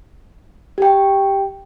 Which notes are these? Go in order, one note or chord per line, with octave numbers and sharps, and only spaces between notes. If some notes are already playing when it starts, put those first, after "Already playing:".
G4 G5